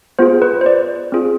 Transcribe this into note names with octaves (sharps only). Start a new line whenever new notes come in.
B3 F4 G#4 C5
B4
C5
D5
C4 F4 G#4